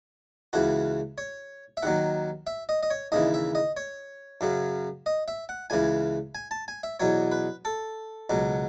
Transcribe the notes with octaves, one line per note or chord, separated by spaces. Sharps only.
C#2 C#3 E3 F#4
C#5
E5
D#2 D#3 F#3 F#5
E5
D#5
D#5
C#5
D#2 C#3 E3 D#5
E5
D#5
C#5
F#2 C#3 F#3
D#5
E5
F#5
C#2 C#3 E3 G#5
G#5
A5
G#5
E5
E2 B2 F#3 C#5
B4
A4
C#2 B2 F#3